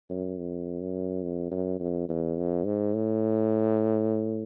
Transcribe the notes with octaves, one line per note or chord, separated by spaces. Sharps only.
F#2
F2
F#2
F2
F#2
F2
E2
F2
G#2
A2